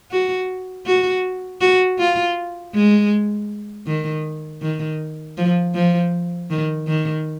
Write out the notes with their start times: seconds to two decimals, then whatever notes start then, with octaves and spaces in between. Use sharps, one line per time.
0.11 F#4
0.86 F#4
1.61 F#4
1.99 F4
2.74 G#3
3.87 D#3
4.62 D#3
5.37 F3
5.75 F3
6.50 D#3
6.88 D#3